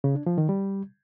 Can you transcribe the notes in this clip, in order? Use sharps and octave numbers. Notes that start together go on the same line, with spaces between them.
C#3
D4
F3
D#3
G3